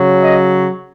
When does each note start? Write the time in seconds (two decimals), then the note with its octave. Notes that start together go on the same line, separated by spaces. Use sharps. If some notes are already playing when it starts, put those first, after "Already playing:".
Already playing: C#3 F#3
0.22 D#5